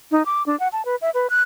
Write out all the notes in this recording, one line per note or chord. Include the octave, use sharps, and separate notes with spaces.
D#4
D6
D4
F#5
A5
B4
E5
B4
F#6